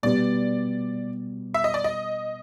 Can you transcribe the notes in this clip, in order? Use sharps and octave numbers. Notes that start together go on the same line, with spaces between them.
B2 G3 B3 D5
E5
D#5
D5
D#5